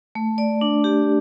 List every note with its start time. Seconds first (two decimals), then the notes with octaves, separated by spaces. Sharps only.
0.15 A3
0.38 D5
0.61 D4
0.84 G4